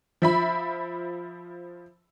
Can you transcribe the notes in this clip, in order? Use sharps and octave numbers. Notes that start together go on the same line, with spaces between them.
F3 E5 B5